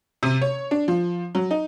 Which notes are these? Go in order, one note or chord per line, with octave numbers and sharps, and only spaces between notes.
C3
C#5
D4
F3
F#3
D#4